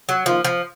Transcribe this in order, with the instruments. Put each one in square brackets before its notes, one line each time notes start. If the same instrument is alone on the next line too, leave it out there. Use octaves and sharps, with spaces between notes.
[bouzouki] F#3
[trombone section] D#3 A#3 F4 [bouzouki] F3
[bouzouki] F3